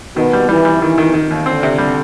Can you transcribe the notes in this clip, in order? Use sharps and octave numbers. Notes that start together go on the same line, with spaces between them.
B2 D#3
G3
E3 G3
G3
D#3 E3
D#3
D#3
D#2
D3 C4
C3
G3